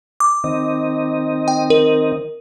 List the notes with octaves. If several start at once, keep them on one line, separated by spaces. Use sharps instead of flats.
D6
D#3 C4 D#5
G5
A#4